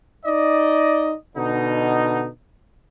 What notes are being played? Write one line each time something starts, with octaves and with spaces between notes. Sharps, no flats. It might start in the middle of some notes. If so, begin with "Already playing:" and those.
D#4 D5 D#5
B2 D3 D#4